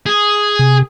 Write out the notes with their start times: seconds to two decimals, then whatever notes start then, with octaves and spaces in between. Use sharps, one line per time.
0.06 G#4
0.59 C3